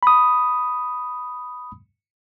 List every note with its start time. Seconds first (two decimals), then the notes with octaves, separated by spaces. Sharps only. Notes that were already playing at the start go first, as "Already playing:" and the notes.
0.03 B5 D#6